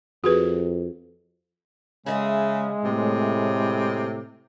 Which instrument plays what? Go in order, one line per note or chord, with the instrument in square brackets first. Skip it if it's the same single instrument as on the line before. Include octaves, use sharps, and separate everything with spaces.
[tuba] F2 [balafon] F#4 G#4 B4
[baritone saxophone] C#3 [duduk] G#3 [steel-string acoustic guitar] G#4 D#5 E5
[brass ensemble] A2 [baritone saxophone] C3